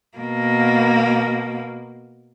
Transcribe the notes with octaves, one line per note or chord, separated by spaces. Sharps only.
B2 A#3